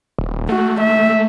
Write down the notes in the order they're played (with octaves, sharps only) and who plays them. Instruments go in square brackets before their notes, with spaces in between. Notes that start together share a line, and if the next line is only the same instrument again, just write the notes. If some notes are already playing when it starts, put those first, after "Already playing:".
[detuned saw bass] D#1
[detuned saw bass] A3 [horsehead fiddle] F#4
[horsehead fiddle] E5